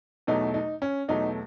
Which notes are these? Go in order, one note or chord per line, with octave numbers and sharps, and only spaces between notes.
E2 B2 F#3 A3 D#4
D#4
C#4
E2 B2 F#3 A3 D#4